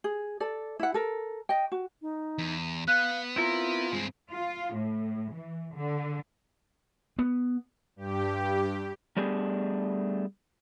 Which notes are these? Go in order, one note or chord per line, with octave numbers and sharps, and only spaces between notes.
G#4
A4 D5
E4 F#5
A4 A#4
D#5 G5
F#4
D#4
E2
B3 F5 F#6
C4 E4 F4 A#4
G2 G#3 C4
F4
A2
E3
D3
B3
G2 G4
G3 A3 B3 D4 G4 G#4